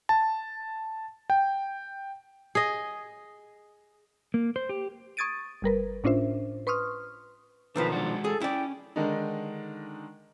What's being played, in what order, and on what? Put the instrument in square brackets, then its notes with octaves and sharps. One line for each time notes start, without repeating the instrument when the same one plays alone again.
[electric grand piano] A5
G5
[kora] G#4 D#5
[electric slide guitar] A#3
C5
G4
[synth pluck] C#6 D#6 G#6 A6 D7 D#7
G1 G3 A#4 B4
A2 C#4 D4 F4 C5 E5
B4 C6 C#6 D#6 F6
[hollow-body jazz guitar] B1 D#3 F3 [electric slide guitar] D4 A#4 [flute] B4
[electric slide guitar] G#3 F#4 F#5 [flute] D4
[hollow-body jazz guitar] G#4 [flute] A4
[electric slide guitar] C#4 [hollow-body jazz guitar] E4 D5 [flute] G5
[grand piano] D3 D#3 G#3 D4 D#4